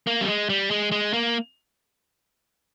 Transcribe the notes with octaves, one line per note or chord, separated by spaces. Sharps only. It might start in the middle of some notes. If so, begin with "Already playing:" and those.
A#3
G3
G#3
G3
G#3
G#3
A#3